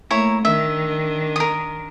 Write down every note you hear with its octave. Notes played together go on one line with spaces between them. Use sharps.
A3 A#3 E4 C#5 A#5
D#3 D4 E5
A#4 D#6